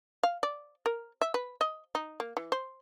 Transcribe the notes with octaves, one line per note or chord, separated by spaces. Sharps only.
F5
D5
A#4
E5
B4
D#5
D#4
A#3
E3
C5